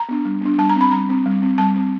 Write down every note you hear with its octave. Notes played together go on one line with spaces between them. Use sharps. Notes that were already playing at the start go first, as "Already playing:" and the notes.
Already playing: A#5
B3 D4
G3
B3 D4
G3 A5
A#5
C4 B5
G3 A#5
C4
G3
C4
G3 A5
C4